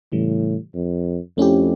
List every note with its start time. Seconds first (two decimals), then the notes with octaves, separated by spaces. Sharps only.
0.12 A2 C#3 E3 G3
0.75 F2
1.37 F2 A3 C#4 E4 G4